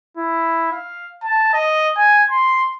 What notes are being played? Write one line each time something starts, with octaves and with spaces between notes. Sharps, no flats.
E4
F5
A5
D#5
G#5
C6